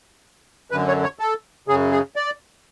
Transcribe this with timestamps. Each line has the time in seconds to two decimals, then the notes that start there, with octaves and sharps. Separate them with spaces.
0.71 F#2 D3 B4
0.88 C#5
1.03 C#5
1.19 A4
1.68 F#2 C#3 G#4
1.92 G#4
2.16 D5